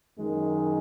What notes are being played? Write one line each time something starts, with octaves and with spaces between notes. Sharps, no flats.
F#2 D#3 G#3